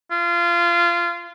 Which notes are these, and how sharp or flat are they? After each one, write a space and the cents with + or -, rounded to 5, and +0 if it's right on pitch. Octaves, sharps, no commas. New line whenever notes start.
F4 -20